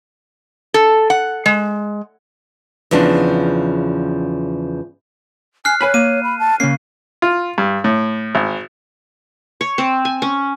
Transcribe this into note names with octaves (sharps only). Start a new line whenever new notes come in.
A4
F#5
G#3
E2 C#3 F3 D4
G#5 F6 F#6 C7
B4 C#5 G#5 B5
A#3 D#7
B5
A5
C#3 A#3 C#4 C7
F4
G2
A2
G#1
C#5
C4
G#5
C#4